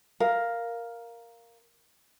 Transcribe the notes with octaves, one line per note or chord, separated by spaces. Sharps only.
A#4 F5